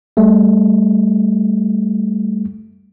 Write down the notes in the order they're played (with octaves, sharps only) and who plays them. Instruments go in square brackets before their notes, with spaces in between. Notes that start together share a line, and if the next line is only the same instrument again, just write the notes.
[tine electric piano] G3 A3